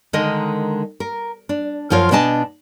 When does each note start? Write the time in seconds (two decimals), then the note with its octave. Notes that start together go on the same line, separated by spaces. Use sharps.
0.13 D3 D#3 G#3 A#4 D#5
1.00 A#4
1.49 D4
1.90 F#2 F3 F4 A#4 C#5
2.11 B2 B3 D4 D#5 G#5 A5